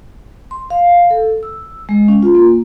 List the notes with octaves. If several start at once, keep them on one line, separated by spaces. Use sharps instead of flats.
C6
F5
A4
E6
G#3
C#4
F4
A#3